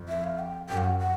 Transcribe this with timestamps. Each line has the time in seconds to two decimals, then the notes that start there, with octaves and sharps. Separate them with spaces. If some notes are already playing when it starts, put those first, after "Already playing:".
Already playing: F2
0.08 E5
0.24 F5
0.39 G5
0.69 F#2 G5
0.77 F5
0.84 F#5
0.99 F#5